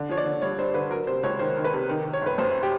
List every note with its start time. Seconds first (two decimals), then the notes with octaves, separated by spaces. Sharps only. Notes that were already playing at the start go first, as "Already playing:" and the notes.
Already playing: D3
0.09 F3 C#5
0.17 D5
0.25 D3
0.41 G2 C#5
0.59 G2 C5
0.74 D3 B4
0.91 F#3 A#4
1.07 C3 C5
1.23 C#2 C#5
1.39 D#3 C5
1.57 D#3
1.64 B4
1.73 C3
1.89 D#3
2.05 D#3
2.13 C#5
2.22 G1 B4
2.38 F#2 C5
2.63 G4